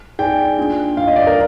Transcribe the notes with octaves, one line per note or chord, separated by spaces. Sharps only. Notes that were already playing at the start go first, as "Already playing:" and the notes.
D#4 G#4 D5 G5 G#5
A#3 D4 F4
A#3 D4 F4 F5
D#5
D5
A#4